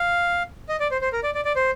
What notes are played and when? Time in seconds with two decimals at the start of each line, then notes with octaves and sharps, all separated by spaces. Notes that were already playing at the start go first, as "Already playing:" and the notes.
Already playing: F5
0.69 D#5
0.80 D5
0.91 C5
1.01 C5
1.13 A#4
1.23 D5
1.35 D5
1.45 D5
1.56 C5